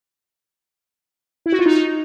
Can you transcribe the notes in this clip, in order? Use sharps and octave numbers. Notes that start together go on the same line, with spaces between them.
E4
F#4
F4
D#4